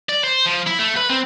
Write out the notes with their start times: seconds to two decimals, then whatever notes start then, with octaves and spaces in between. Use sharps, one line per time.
0.09 D5
0.24 C5
0.46 F3
0.67 E4
0.80 A3
0.97 B4
1.10 C4